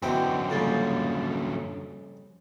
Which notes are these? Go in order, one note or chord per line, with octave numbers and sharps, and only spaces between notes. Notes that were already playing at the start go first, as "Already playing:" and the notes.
F#2 B2 D3 C4 E4 G5
F2 C#3 G3 A#3 C#4 F4